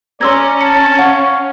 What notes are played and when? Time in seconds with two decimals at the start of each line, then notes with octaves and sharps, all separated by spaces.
0.21 C#4 D5 A#5 C6 E6 G#6
0.61 A5 C#7
0.99 C#5 F5 F#5